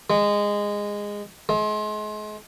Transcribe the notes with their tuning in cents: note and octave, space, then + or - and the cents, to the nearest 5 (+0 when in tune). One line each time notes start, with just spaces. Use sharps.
G#3 -15
G#3 +35